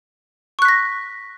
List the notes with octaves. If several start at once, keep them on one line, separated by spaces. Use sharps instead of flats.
C#6 F#6 A#6 B6